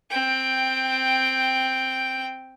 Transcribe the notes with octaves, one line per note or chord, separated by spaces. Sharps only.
C4 G5